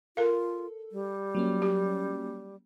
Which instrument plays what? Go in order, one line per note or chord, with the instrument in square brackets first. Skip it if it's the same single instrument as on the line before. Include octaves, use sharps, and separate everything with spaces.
[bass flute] F4 [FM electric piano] A4 [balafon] A#4 F5
[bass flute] G3
[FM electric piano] F#3 A#3 C#4
[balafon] G4